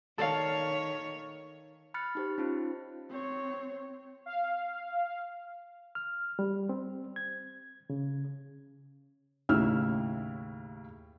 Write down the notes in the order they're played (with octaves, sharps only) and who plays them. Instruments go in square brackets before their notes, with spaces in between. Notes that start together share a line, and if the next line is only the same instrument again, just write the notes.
[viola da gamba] D#3 C#5 [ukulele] A4 D5 F5
[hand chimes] B5 F6 F#6 A6 C#7
D#4 G4 C5
C#4 D#4 F4 C5
[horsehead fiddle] C4 C#5
[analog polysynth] F5
[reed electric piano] F6
G3
C4
G#6
C#3
[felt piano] D#2 A2 C#3 E4 E6 F6